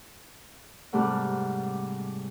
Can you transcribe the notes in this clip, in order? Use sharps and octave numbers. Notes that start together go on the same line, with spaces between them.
G#2 C3 G3 A3 F#5 F6